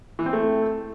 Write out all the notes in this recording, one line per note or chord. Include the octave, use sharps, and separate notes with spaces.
E3
C4
A3